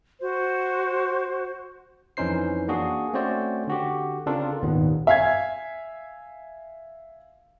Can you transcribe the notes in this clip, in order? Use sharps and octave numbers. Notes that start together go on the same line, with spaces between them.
F#4 C5
F2 E3 C#4 D#4 C5 C7
A#3 D4 F#4 G#4
A3 C4 C#4 F#4 C5 D5
D3 F#4 G4
C#3 C4 D4 F4 A4 A#4
G#1 D#2 A#2 D#3 B3
E5 F5 G#5 G#6